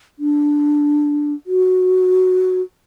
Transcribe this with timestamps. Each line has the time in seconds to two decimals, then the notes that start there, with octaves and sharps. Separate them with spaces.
0.19 D4
1.47 F#4